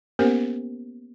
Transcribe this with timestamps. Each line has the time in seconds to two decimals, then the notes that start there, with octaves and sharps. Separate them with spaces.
0.19 A#3 B3 C#4 G4 A#4 C5